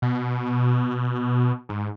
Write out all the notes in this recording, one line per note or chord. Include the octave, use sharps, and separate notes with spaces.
B2
G#2